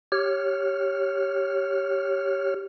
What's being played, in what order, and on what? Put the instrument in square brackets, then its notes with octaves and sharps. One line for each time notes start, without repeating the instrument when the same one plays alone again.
[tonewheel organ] G4 C#5 F6